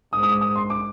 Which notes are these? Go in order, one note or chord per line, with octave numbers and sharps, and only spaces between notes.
G#2 D#6
D#6
D6
D#6
C6
D6